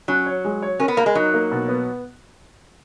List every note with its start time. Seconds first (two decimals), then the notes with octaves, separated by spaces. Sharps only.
0.08 F#3 C#4
0.26 C#5
0.45 G#3
0.62 C#5
0.80 C#4 A#4
0.88 B3
0.97 A#3 A#4
1.06 G#3
1.15 F#3 D#4
1.34 A#3
1.51 B2
1.68 B3